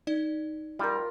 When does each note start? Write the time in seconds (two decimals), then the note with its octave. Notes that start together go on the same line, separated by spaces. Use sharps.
0.07 D#4 D5
0.79 G3 F4 A#4